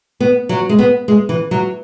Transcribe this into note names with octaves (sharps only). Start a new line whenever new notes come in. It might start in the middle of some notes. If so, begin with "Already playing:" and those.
B3
F#3
G#3
B3
G#3
E3
F#3